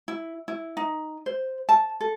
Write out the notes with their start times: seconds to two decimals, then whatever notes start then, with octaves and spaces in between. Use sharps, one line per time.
0.08 E4
0.48 E4
0.77 D#4
1.26 C5
1.69 A5
2.01 A4